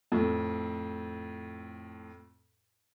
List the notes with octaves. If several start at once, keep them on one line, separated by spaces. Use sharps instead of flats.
F2 A2